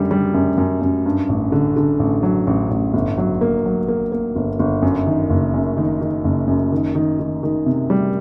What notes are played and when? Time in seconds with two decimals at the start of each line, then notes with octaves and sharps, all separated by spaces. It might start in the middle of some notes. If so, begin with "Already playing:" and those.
Already playing: F#2 D3 G3
0.11 G3
0.34 F#2
0.58 F#2
0.81 F#2
1.06 G2
1.29 A1
1.52 D3
1.76 D3
1.99 A1
2.23 F#3
2.47 A1
2.71 A1
2.93 G1
3.18 F#3
3.41 A#3
3.65 F#3
3.88 A#3
4.12 A#3
4.36 G1
4.59 G1
4.82 F#2
5.07 D#3
5.30 F#1
5.54 F#2
5.77 D#3
6.01 D#3
6.24 F#1
6.47 F#2
6.72 D#3
6.95 D#3
7.19 D#3
7.43 D#3
7.66 C3
7.90 G3